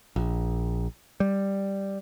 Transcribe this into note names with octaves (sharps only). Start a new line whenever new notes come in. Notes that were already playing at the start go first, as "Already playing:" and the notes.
A#1
G3